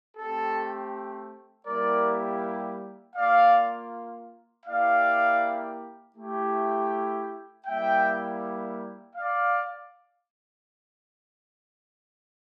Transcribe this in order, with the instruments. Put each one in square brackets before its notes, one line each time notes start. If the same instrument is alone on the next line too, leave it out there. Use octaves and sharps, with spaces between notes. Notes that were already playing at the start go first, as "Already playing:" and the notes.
[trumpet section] A3 C4 G4 A4
G3 A#3 E4 G4 A#4 D5
A#3 F4 D5 F5
A#3 E4 G4 D5 F5
A3 E4 G4
G3 A#3 E4 E5 G5
D5 F5